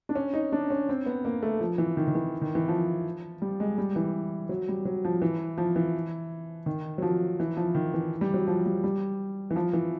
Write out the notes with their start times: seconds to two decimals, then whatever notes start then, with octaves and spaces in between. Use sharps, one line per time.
0.09 D4
0.15 C#4
0.34 D#4
0.52 D4
0.70 C#4
0.89 C4
1.06 B3
1.25 A#3
1.43 A3
1.60 F3
1.78 E3
1.97 D#3
2.08 D#3
2.15 E3
2.41 D#3
2.55 E3
2.68 F3
3.42 G3
3.60 G#3
3.78 G3
3.96 E3
4.49 F#3
4.68 G3
4.85 F#3
5.05 F3
5.22 E3
5.58 F3
5.76 E3
6.66 D#3
6.98 F#3
7.02 F3
7.40 E3
7.57 F3
7.75 D#3
7.94 E3
8.21 G3
8.34 F#3
8.48 F3
8.66 G3
8.84 G3
9.50 E3
9.56 F3
9.73 E3